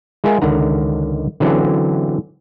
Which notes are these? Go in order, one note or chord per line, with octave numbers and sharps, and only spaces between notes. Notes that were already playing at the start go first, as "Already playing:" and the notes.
G#3 F4 G#4 A#4 E5 G#5
C#2 D3 D#3 F#5 A#5
D3 E3 F#3 C4 C#4